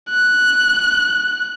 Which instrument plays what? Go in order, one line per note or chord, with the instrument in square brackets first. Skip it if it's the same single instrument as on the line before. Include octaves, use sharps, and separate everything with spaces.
[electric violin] F#6